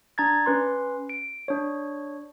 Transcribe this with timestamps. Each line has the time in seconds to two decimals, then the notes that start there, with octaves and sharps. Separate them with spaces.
0.18 D4 A#5 G#6 A6
0.46 C#4 B4 C6
1.09 D7
1.48 D4 C#5